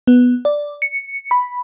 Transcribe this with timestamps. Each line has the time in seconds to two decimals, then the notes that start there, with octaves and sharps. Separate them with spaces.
0.07 B3
0.45 D5
0.82 C#7
1.31 B5